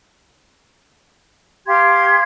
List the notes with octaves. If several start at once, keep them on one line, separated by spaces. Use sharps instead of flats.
G4 F5 C6 G#6